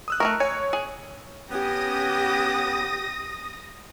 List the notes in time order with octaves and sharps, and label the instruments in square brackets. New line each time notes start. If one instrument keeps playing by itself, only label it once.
[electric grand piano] D#6 E6 F#6
[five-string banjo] A3 A#3 A#4 [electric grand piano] C#6
[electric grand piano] C#5 C#6 [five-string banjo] G#5
[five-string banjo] G#4
[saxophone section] B3 C#4 [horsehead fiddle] G4 [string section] D#6 A#6